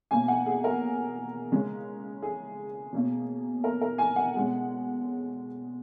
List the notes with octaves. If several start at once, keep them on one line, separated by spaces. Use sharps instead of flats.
B2 A#3 C#4 G#5
F#5
G#4
A#4
C#3 G#3 C#4
G#4
B2 A#3 C#4
A#4
A#4
G#5
F#5
B2 G#3 C#4